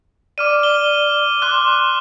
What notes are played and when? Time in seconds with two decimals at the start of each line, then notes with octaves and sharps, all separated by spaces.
0.38 D5 D6 F6 D#7
0.63 G7
1.42 C6 D6 F#6